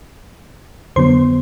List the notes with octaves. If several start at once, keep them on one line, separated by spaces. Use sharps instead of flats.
F2 D3 F#3 B3 C5 C6